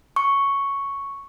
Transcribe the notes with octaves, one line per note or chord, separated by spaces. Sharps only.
C#6